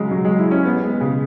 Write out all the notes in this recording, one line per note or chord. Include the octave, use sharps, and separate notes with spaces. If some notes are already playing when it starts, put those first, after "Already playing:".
Already playing: C#3 F#3 G#3
F#3
G#3
E4
C#4
B3
G#3
C#3